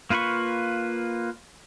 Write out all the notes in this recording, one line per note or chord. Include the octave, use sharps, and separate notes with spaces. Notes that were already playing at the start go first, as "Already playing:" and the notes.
A#3 F4 B4 B5 C#6